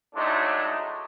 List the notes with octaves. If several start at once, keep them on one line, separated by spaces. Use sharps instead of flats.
A2 F#3 G#3 A3 D4 D#4